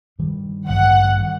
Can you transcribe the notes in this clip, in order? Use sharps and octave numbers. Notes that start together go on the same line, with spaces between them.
G2 D#3 G3
A1 G2 D3 F#3 F#5
D#3 G3